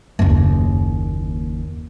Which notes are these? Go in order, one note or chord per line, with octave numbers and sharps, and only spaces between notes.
F#1 D#2